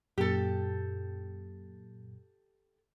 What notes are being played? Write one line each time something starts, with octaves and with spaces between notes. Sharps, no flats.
F#2 A#2 G4 A4